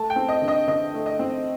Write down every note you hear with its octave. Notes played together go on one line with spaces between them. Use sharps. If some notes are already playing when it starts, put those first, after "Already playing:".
Already playing: A3 A5
G5
C4
D#5
D3
D#5
D3 D#5
A3
D#5
C4